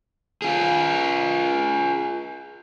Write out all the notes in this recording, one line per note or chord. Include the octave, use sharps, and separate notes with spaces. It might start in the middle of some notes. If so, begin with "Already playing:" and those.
F4 G#4